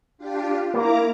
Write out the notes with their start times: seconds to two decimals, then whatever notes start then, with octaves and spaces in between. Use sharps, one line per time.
0.18 D4 F4 G4
0.74 A#3 E4 A#5 D6